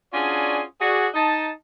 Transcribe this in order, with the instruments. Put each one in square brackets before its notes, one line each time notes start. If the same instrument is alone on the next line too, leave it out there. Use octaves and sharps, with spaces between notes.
[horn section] C#4 D4 F4 F#4 G#4 D5
F#4 G#4 D5
D#4 A5